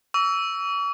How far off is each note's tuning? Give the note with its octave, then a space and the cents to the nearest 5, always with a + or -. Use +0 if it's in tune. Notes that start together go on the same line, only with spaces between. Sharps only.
C#6 +45 E6 +0